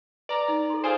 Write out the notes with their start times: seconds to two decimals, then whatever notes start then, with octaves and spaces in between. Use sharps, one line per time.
0.29 B4 D5 A#5
0.48 D#4
0.70 A4 C6
0.84 F4 G#4 C5 G#5